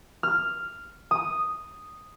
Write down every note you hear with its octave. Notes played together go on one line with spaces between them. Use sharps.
F6
D#6